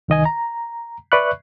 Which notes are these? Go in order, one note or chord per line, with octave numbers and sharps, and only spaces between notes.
C2 D#3 D#5 G#5
A#5
B4 D5 E5 B5 C#6 F#6